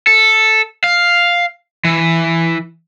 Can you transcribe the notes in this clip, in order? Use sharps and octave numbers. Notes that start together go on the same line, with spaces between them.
A4
F5
E3